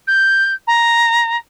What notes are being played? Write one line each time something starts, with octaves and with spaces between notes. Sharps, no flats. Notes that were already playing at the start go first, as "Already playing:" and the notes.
G6
A#5